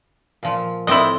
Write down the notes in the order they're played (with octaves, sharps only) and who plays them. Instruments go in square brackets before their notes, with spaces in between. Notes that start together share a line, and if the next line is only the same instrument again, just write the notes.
[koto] A#2 F3
[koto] A2 C4 D5 [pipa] E4 D#5